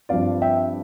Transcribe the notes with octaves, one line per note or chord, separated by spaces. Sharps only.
G2 F3 C4 D5 F5
E5 G5